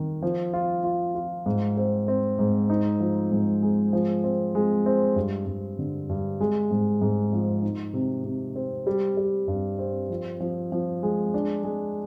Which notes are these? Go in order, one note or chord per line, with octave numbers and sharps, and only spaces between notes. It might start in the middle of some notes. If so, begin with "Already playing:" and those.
Already playing: D#3
F3
F4
F4
F4
G#2
C4
C4
G#2
D#4
F3
G#2
G#3
F3
C4
G#3
C4
G2
G2
D3
G2
G#3
G#2
G#2
F3
D#4
C3
C3
C4
G3
G3
G2
C4
F3
F3
F3
G#3
D4
G#3